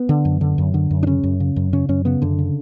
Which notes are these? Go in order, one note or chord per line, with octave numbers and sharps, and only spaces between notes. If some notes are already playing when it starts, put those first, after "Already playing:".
Already playing: B3
D3
F#2
D3
F#2
D3
F#2
D4
C#3 C#4
F#2
C#3
F#2
C#3 C#4
F#2 C#4
C#3 B3
F#2 D3
C#3